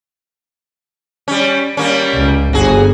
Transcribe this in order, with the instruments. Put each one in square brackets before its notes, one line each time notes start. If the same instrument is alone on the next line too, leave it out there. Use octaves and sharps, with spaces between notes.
[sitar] G3 C#4
G3 A#3 C#4
[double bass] C#2
[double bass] G1 [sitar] F#4 G#4